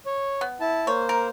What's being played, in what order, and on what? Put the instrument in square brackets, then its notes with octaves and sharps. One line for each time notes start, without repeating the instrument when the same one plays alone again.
[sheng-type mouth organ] C#5
[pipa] B3
[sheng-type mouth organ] E4 A5
[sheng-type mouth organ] A#3 C5 [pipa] C#5
[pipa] A#4